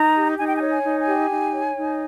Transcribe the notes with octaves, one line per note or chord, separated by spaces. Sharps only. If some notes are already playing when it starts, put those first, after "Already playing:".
Already playing: D#4 A#5
G4
D#4 G#5
G5
G#5
C#5
G#5
D#4
G#5
G4
D#4
C#5
D#4